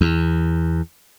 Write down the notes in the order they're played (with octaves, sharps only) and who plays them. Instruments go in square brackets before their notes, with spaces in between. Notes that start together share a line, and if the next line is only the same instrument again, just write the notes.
[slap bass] E2